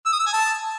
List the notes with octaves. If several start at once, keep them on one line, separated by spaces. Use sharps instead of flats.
E6
D#6
E6
G#5
A5